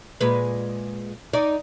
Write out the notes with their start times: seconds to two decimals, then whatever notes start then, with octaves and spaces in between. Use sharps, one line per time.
0.21 A#2 G#3 B4
1.33 D#4 D5